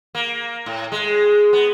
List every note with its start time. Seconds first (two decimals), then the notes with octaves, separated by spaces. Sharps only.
0.15 A#3
0.66 A2
0.92 G#3
1.53 B3